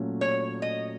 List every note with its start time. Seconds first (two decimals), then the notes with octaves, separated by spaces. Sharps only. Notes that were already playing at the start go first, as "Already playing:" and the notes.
Already playing: A#2 F#3 A3 C#4 F#4
0.21 C#5
0.62 D#5